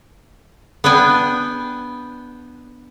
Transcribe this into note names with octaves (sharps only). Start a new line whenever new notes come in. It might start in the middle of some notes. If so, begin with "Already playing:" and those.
B3 D4 G5 G#5